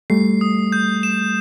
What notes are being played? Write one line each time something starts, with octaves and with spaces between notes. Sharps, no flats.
G3 A3 C7
D#6
G6
E7